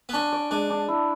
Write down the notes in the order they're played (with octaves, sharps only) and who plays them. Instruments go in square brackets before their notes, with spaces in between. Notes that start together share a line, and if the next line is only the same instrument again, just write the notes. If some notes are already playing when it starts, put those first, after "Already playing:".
[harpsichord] B3
[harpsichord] C#4 [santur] D4
[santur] D5
[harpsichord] G#3 [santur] D4
[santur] D4
E4